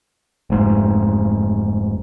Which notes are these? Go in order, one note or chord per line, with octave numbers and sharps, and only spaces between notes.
F1 G#2